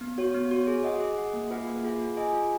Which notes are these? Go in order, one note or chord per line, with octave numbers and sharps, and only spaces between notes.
B3
F#4 C#5
B3
F#4 C#5
G#4
D#5 F#5
G#4
D#5 F#5
A#3
F4 G#4 B4 F#5
A#3
F4 G#4 B4 F#5
F4
G#4 D#5 G#5
F4